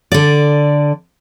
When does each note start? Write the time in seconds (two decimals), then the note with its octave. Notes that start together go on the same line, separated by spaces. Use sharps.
0.12 D3 D5